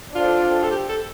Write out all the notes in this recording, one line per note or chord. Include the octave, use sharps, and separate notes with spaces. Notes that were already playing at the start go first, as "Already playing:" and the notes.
D4 F4 A4 C5 G5
A4
G4
A4